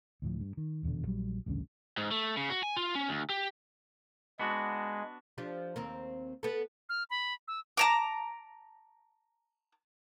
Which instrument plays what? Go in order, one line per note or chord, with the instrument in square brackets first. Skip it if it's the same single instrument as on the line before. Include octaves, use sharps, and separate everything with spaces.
[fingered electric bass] D2 A2 F3
G2
D#3
D#1 E2 B2 D3
A#1 F#3 G3
A1 D2 G2 C#3
[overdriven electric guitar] G#2
A3
C#3
F#4
G#5
F4
C#4
D2
G4
[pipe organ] G#3 [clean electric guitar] B3 D4 F#4
[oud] F3 D4 G4
D#2 C4 A#4
B3 A4
[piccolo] F6
B5
E6
[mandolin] A5 A#5 D6